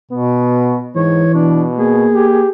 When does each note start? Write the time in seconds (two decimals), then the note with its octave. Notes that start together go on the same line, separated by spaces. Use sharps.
0.11 B2 B3
0.96 G#2 E3 C#5
1.34 B2 D4
1.78 A#3 G#4
2.15 G4